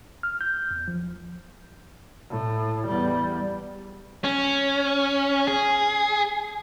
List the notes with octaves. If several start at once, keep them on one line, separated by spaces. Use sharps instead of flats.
F6
G6
E2
F3
A2
E2 G3
C#4
G#4